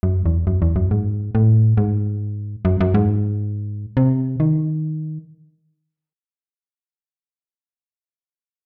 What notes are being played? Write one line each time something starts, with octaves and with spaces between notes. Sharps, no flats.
F#2
E2
F#2
E2
F#2
G#2
A2
G#2
F#2
F#2
G#2
C3
D#3